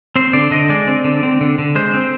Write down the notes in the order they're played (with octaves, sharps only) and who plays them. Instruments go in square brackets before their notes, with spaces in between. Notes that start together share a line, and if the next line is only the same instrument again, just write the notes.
[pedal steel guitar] C4 C5
D3 D5
D3 D#5
G#3 D5
C4
D3
C4
D3
D3
G#3 C5
C4